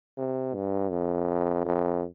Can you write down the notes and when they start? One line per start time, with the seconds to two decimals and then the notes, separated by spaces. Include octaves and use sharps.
0.17 C3
0.55 G2
0.91 F2
1.65 F2